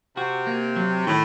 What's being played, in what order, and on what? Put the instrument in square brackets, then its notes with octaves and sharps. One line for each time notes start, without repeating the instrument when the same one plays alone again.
[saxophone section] C3 [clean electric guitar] F#4
[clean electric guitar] A#3
F#3
[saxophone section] A2 [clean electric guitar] D#3